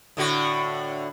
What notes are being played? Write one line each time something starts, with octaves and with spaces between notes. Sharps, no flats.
A2 D3 F#4